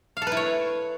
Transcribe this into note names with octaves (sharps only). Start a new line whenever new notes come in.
F5
A4
B4
E4
C#5